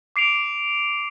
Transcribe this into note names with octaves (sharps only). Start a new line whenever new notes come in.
D6 C7 D7 F7